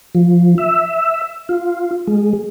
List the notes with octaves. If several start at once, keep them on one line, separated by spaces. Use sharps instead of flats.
F3
E5
F4
G#3